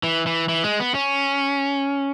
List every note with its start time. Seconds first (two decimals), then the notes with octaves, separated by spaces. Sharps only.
0.03 E3
0.26 E3
0.49 E3
0.64 G#3
0.80 B3
0.95 C#4